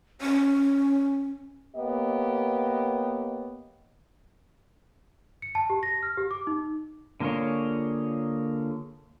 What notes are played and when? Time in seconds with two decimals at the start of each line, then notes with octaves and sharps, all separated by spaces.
0.21 C#4
1.76 A#3 B3 G4 C#5 D#5
5.42 C#7
5.55 A5
5.70 G4
5.83 A#6
6.03 F6
6.17 G4
6.31 D6
6.47 D#4
7.20 D3 A#3 F4 G#4 C#5